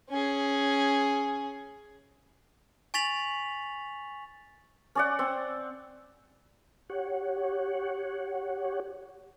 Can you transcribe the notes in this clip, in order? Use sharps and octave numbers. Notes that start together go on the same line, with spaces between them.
C#4 G#4
G#5 C#6 A6 B6 F7 F#7
C#4 D5 F#5
C4
G4 C#5 F#5